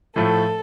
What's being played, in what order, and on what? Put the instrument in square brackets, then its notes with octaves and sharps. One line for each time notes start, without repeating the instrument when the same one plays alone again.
[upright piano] A2 F3 A3 [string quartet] A4